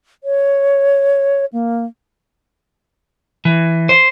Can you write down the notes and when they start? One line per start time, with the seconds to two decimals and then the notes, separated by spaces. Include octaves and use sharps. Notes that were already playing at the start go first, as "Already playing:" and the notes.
0.24 C#5
1.53 A#3
3.45 E3
3.89 C5